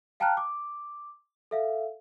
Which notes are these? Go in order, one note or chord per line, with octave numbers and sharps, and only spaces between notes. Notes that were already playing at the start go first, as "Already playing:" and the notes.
F5 G5 A5 A#5 F6 F#6
D6
A4 E5 F5